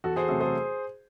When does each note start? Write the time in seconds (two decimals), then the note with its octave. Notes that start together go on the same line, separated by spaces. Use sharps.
0.04 E2 F#4 A4
0.16 G#4 C5
0.28 C3 F#3 A3 F#4 A4
0.40 G#4 C5